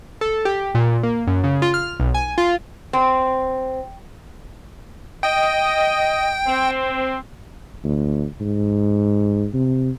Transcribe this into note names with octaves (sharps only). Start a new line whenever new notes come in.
A4
G4
A#2
A#3
F#2
C#3
F4
F6
B1
G#5
F4
C4
D#5 G5
C4
D2
G#2
C3